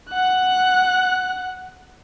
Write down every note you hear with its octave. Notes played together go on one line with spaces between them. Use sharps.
F#5 F#6